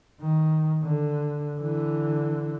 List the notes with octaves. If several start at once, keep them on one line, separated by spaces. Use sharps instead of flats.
D#3
D3
D3 E3